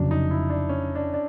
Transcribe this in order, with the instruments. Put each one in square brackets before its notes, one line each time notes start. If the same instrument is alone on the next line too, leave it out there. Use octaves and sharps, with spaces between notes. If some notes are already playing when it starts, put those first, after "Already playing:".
Already playing: [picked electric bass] F1 F2 C#3 F#3 [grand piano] D4
[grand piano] D#4
E4
D4
C#4
D4
D4